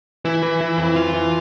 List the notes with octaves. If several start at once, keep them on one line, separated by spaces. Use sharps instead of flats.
E3 E4
E3
E3
F2
E3 F4
E3